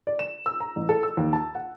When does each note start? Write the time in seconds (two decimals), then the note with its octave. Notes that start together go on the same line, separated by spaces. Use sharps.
0.07 D5
0.19 E7
0.46 E6
0.60 A#5
0.76 A1
0.89 A4
1.03 E6
1.17 D#2
1.33 A5
1.55 F#5